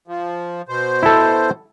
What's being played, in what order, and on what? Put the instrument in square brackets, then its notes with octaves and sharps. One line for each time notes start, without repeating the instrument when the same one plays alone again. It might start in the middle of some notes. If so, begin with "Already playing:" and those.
[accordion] F3
B2 C5
[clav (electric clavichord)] E4 A4